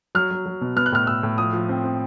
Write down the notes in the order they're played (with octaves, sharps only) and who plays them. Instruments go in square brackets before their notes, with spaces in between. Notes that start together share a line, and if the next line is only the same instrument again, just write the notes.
[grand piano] F#3 F6
F#3
F#3
B2
B3 F6
F#6
A2 F6
A2 E6
A2
F3 D#6
F3
C4
C4